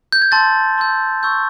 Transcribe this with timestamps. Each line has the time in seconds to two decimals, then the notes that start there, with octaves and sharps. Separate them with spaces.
0.12 G6
0.22 G#6
0.31 A5 C6 E6 G6 A6
0.78 A5 C6 E6 G6
1.23 C#6 E6 G6